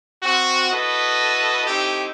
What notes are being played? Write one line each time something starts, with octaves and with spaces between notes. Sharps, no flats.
C4 F#4
E4 F#4 A4 B4 D#5
A3 C4 D#4 E4 G4